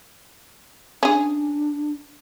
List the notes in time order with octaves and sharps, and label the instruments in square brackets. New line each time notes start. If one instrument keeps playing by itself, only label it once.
[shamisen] C#4 G#4 [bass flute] D4